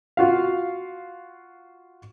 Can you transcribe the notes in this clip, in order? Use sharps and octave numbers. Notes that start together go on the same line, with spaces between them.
F4 F#4 F5